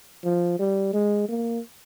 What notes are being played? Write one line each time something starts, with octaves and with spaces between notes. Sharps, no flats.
F3
G3
G#3
A#3